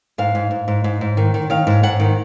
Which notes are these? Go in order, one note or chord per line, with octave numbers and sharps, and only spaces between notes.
G#2 F5
G#2
G#2
G#2
G#2
G#2
D#3
D#3
D#3 F5
G#2
G#2 F#5
D#3